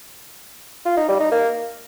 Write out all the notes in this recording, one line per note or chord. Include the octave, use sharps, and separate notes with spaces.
F4
D#4
G3
D#4
A#3